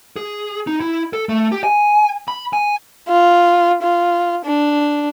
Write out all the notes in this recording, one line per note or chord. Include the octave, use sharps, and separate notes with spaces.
G#4
D#4
E4
A4
A3
G4
G#5
B5
G#5
F4
F4
D4